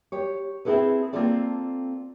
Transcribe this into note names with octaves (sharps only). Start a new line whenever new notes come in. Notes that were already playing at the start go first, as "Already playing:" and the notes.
G4 C#5
C4 E4 G#4 A4 B4
A#3 C4 F4 A4 D5